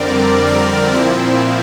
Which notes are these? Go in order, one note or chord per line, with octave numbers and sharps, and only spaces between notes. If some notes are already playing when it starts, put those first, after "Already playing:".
Already playing: F2 D3 G3 C4 A#4 D5
A#4
A#2 F3 C4 E4